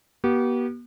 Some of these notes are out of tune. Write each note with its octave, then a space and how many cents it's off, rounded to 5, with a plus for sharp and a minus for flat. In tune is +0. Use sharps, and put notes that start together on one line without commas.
B3 -40 G4 -35